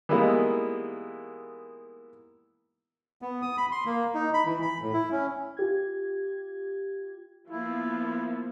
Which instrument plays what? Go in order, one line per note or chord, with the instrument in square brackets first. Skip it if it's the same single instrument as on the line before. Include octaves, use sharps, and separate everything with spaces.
[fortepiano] E3 G3 G#3 A#3 B3 D#4
[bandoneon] B3
D#6
B5
C6
A#3
D#4
B5
E3
B5
A2
E4
C#4
[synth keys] F4 G4 G#6
[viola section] F3 A#3 B3 [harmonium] E4